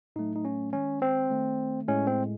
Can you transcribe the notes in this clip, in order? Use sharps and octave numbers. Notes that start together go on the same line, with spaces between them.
A2 F#3 A3 D#4
D#4
C#4
D#3 G#3 C#4
C4
D#3 A3
A2 G#3 C#4
C4